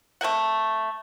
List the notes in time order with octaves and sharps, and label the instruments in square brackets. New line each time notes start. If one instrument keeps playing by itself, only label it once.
[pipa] A3 C4 A#4 F#5